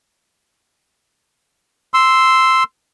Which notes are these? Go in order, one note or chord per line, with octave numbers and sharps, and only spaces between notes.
C6 E6